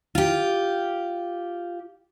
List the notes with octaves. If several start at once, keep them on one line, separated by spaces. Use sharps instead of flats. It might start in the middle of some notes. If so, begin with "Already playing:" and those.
F4 G4